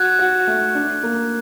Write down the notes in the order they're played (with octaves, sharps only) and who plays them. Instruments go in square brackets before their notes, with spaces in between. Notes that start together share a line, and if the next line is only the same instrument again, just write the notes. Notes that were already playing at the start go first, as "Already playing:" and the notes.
Already playing: [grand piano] F#4 [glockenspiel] F#6 G#6
[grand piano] F#4
A3
D4
A#3